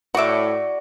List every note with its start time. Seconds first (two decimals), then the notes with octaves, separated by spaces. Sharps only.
0.15 A2 F#4 D5 E5 F#5 D6